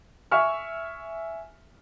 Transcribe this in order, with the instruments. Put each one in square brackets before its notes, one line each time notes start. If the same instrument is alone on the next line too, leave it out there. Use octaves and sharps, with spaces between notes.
[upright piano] E5 G#5 C#6 F6